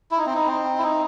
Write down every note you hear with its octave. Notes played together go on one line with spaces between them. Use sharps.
E4
D#4
C4
D#4
C4
E4
D#4